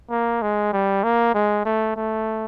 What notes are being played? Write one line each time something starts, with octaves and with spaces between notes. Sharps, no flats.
A#3
G#3
G3
A#3
G#3
A3
A3